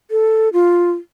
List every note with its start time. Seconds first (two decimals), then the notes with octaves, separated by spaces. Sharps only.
0.11 A4
0.53 F4